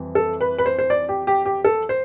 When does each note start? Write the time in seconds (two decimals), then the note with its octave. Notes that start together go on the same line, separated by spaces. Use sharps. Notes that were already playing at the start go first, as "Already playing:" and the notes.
Already playing: F2 E3 G3
0.15 A4
0.41 B4
0.58 B4
0.66 C5
0.79 C5
0.90 D5
1.09 G4
1.27 G4
1.46 G4
1.65 A4
1.89 C5